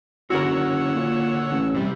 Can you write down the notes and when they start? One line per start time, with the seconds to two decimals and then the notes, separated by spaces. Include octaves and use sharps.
0.30 F#1 D3 F#4 A#4 C#5 F#5 E6
0.95 A#2
1.51 A1
1.74 C3 G3